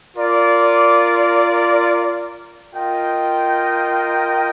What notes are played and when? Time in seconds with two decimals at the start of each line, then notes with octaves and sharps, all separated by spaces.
0.16 F4 A#4 D5
2.74 F4 A#4 D#5 G5